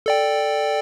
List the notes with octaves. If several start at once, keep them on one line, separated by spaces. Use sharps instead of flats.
A4 D5 G5